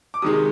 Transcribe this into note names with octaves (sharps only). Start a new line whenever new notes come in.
D6
C3 D#3 G#3 D#6